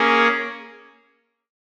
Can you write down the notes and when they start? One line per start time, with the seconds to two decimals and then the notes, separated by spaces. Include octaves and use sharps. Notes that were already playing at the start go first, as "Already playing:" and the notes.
Already playing: A#3 C#4 G#4